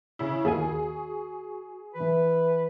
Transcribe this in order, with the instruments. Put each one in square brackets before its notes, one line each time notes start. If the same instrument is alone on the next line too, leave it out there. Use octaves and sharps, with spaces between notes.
[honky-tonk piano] C#3 E4
[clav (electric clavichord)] D#2 F4 G#5 [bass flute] F#4 [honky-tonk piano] G#4
[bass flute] E3 [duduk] B4